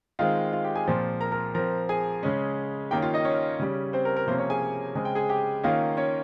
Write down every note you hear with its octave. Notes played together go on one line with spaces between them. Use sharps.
D#3 G#3 C4 F4 F5
F4 F5
G4 G5
G#4 G#5
A#2 F3 C4
A#4 A#5
A#4 A#5
F3 C4 A#4 A#5
G#4 G#5
C#3 G#3 C#4
D#3 A#3 C#4 G4 G5
F4 F5
D#4 D#5
C#4 C#5
C#3 G3 C#4
C4 C5
A#4
A#4
C3 F3 A#3 C4 C#4 C5
C#4 C#5
G#4 G#5
C#3 G#3 C4 G#5
G5
G#4 G#5
G4 G5
D#3 A#3 C#4 F4 F5
C#4 C#5